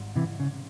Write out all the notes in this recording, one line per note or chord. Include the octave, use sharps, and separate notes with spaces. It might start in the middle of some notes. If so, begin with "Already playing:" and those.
Already playing: G#1 G#2 G3
C3 E3
C#3